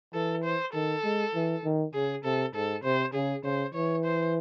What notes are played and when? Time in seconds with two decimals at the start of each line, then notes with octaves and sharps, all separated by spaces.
0.14 E3 A4
0.44 C5
0.74 D#3 A4
1.04 G#3
1.35 E3
1.64 D#3
1.94 C#3 G#4
2.24 C3 A4
2.55 G#2 A4
2.84 C3 C5
3.14 C#3 G#4
3.44 C#3 C5
3.74 E3 C#5
4.05 C5